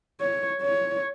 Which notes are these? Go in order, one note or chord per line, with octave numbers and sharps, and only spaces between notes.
C#5
C#5